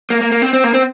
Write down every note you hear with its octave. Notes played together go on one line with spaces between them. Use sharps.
A#3
A#3
A#3
C4
C4
A#3
C4